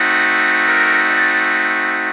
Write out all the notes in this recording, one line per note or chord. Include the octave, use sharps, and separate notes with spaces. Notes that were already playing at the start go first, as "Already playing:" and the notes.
Already playing: A3 C4 D#4 F#4
A#4
D5